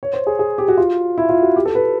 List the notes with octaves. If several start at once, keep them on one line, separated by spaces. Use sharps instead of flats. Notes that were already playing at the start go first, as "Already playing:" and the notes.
C#5
C5
G#4
G#4
G4
F#4
F4
E4
F4
F#4
G4
A4
B4